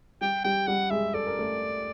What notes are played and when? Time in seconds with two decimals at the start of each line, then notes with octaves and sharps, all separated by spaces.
0.21 G3 G4 G5
0.44 G3 G4 G5
0.67 G3 G4 F#5
0.91 G#3 G#4 E5
1.14 A4 D5
1.27 A#4
1.39 A3 A4